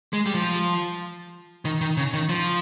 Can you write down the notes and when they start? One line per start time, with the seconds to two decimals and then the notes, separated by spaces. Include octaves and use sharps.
0.13 G#3
0.26 G3
0.34 F3
1.65 D#3
1.81 D#3
1.97 C#3
2.13 D#3
2.29 F3